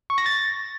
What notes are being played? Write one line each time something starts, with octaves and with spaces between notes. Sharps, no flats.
C#6
A#6
A6